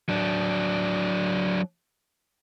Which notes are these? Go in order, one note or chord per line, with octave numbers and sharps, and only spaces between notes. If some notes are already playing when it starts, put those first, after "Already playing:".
F#3 D4